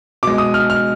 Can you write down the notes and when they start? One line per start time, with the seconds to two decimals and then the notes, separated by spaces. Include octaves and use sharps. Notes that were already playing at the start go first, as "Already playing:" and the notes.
0.23 B2 G#3 D6
0.38 D#6
0.54 F6
0.70 F6